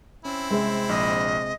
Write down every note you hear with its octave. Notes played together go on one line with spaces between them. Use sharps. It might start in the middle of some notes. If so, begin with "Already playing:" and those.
C4 C#4 E4
C3 G#3
A#1 D#5